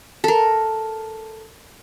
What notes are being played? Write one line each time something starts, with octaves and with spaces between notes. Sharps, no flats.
A4 A#4